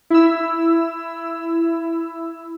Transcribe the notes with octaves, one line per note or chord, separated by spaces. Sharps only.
E4 E6